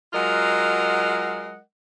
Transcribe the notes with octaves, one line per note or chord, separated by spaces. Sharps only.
F#3 G#3 F4 A#4 D#5 F#5